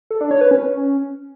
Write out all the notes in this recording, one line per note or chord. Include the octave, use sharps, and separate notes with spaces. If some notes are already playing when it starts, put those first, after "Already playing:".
A4
D4
C#5
B4
C#4